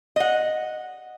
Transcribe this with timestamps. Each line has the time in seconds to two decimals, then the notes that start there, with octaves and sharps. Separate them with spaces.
0.16 D#5 F#5